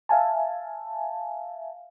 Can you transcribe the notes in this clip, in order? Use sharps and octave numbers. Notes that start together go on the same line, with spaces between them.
E5 F5 G#5 A5